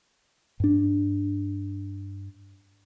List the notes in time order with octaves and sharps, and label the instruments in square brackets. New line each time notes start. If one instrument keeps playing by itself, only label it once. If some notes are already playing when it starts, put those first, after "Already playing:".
[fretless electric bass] G2 D4